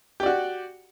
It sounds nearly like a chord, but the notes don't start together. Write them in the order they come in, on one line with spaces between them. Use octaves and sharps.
G4 D5 F#4